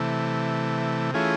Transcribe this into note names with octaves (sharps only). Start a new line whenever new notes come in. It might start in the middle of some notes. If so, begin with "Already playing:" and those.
Already playing: C3 E3 A3
E3 A3 C#4 F4 G#4